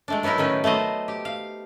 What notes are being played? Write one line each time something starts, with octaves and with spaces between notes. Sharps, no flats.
G#3 A3 D4
F#3 B3 D#4 E4 A#4
A2 D#3 C#4 B4
A3 B3 C5 D#5
G4
F5